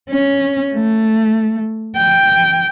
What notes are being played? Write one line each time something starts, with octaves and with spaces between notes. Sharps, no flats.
C#4
A3
G5